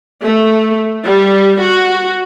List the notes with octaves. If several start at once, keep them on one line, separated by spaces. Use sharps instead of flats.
A3
G3
F#4